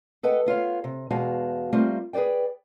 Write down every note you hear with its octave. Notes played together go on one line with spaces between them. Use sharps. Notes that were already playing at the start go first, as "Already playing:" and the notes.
A4 B4 D#5 F#5 G5
B3 F4 C#5 F5
C3
E2 B2 G#3 F#4 F5 A5
G3 A3 A#3 C4 F4
G#4 B4 C5 D5 G5